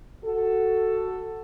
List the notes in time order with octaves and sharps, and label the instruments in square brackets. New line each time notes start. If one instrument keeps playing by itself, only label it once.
[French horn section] F#4 A4